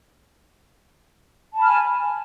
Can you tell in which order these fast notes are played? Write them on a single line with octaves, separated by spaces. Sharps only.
A5 B5 F6 G#5